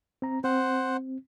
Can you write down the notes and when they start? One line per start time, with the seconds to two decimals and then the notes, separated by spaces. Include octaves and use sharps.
0.22 C4 A#5
0.44 C4 C5 F#5